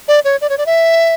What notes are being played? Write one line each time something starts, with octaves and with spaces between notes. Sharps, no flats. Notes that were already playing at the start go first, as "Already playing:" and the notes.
D5
C#5
D5
C#5
D5
E5